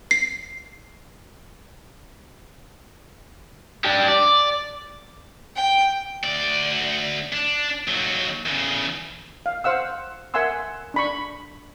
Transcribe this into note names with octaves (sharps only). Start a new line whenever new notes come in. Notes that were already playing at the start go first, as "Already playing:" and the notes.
C7
D4 G4
D5
G5
D2 D5
D4
D#2 F#3
E2 C#3
F5
C5 F5 F#5 E6
A#4 E5 F#5 G#5 C6 E6
D4 B5 C#6